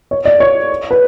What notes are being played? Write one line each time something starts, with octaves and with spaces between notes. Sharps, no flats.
C#5
D5
C#5
B4